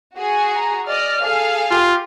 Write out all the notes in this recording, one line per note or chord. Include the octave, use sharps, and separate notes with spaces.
F#4 G#4
A#5
D5 D#5 F6
G#4 A4 F5
F4 G4